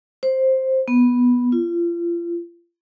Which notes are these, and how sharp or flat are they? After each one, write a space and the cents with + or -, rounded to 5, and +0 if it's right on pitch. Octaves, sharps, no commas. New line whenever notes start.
C5 +5
B3 -10
F4 -35